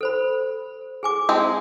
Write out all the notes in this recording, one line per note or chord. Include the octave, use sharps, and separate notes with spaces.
A4 C5 B5
G#4 G#5 D6
G#3 C4